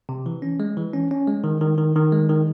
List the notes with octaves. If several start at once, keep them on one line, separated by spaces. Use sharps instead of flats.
C3
E3
C#4
G#3
E3
C#4
C#4
G#3
D#3
D#3
D#3
D#3
G#3
D#3